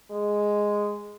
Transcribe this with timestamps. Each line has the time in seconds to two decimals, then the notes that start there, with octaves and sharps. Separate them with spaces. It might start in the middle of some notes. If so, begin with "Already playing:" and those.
0.11 G#3